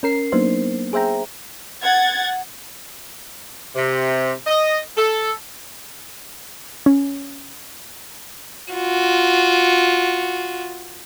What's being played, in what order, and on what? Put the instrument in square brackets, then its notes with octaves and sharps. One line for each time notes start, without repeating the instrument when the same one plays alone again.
[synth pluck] C#4 A#4 C7
F#3 A#3 B3 D4 D#4 C5
G#4 C5 E5 G5 A#5
[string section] F#5 G#6 A6
[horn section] C3
D#5
A4
[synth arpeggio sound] C#4
[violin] F4 F#4